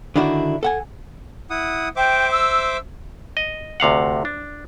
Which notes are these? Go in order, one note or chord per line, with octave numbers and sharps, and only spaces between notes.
D3 D#3 D4 E4 F#4
A4 F#5 G#5
E4 F#5 D#6
C5 E5 G5 D6
E6
D#5
D2 C3 F5 F#5
D4